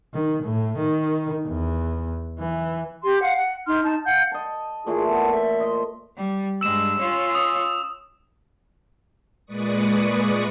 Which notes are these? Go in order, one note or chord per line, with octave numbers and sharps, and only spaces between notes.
D#3
A2
D#3
E2
E3
G4 C6
F5 F#5
F#5
D#4 C6 F6
D#4 A5
F5 F#5 G6
D#5 A5
A#2 E3 A3 E4 G#4
B3 A4
E5
C5 D#5
G3
G2 G#3 E6 E7
C#4 F4
D#6
A#2 G#3 B4 D5 C#6 D#6